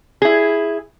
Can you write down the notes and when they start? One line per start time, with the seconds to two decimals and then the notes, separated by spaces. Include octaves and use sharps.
0.22 E4 G#4